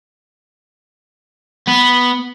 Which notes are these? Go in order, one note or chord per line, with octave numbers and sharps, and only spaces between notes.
B3